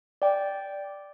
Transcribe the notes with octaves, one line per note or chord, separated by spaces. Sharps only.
D5 G5